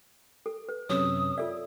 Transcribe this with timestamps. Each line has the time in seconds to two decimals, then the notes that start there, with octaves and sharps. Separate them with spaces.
0.46 A4
0.69 B4
0.90 F#2 C3 C#5 D#6 E6
1.38 F4 A4 D5 E5